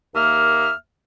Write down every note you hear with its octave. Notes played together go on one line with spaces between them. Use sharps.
D#2 A#3 E5 F6